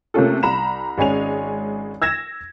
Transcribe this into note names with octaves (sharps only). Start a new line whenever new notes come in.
C3 A3 A#3 C#4 F4 A4
C2 A#5 B5 E7
G#1 G#3 C#4 G#5 F7
E6 G#6 A#6 E7